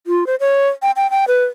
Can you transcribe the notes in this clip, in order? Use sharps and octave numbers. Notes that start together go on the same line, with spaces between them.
F4
C5
C#5
G5
G5
G5
B4